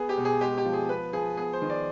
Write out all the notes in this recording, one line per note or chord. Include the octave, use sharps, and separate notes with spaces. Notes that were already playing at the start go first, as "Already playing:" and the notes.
Already playing: B3 G#4
G4
B2
G#4
G#3 G4
G4
F3
G#4
B3 B4
F3 G#4
B3 G#4
C5
D#3
D5